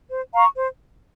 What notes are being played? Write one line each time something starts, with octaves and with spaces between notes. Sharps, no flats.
C5
F5 A#5 C#6
C5